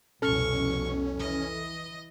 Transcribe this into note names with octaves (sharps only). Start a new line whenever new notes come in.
C2 F2 B2 C#4 A4 C#6 F6
E3 D#5